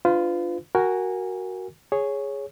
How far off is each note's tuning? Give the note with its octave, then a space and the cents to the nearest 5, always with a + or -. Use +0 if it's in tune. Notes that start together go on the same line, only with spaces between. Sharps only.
D4 +25 F4 +0 B4 +40
F#4 +5 A#4 +0 G#5 -20
G#4 +0 C#5 +0